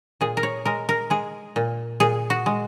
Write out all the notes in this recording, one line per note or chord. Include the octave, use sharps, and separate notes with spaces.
A#2 G#4
A#4
C#5
G#3 A#4
A#4
G#3 G#4
A#2
A#2 G#4
F#4
G#3